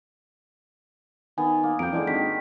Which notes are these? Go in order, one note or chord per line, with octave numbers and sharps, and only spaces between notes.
D#3 B3 G#5
A#3
F2 G5 A#5 D7
D3 E3 G#3 D4
G#1 D#3 B6